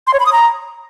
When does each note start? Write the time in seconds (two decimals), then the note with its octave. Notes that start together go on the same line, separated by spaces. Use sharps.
0.07 C6
0.13 C#5
0.20 B5
0.26 D#6
0.32 A#5